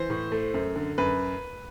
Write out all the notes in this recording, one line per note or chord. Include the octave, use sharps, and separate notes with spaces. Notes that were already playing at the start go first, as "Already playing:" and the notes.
Already playing: E3 C5
A2
A3
F#2
D3
F#2 B4